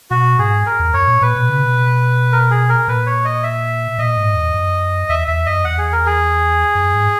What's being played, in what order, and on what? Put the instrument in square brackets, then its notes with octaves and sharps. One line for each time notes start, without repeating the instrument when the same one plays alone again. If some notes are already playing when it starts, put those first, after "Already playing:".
[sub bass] B2 [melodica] F#4
[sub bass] G#2 [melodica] G#4
[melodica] A#4
[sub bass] E2
[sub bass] F#2 [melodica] C#5
[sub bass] A#2
[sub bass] A#2 [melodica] B4
[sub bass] B2
C#3
B2
[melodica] A#4
G#4
A#4
[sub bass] A#2 [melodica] B4
[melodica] C#5
D#5
E5
[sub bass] A#2 [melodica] D#5
[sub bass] G#2
E2
F#2
[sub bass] E2 [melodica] E5
[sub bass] E2 [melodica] E5
[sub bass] F#2 [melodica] D#5
[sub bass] E2 [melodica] F#5
[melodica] G#4
A#4
G#4
[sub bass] F#2
G#2